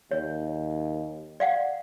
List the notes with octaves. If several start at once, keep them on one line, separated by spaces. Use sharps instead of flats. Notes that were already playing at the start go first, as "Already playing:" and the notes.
D#2 C#5
D5 F5 F#5